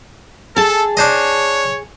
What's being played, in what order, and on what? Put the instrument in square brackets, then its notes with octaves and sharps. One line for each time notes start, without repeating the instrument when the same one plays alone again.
[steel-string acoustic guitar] G#4 A5 [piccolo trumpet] A4
[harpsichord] D4 C5 D#5 [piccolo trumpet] C#5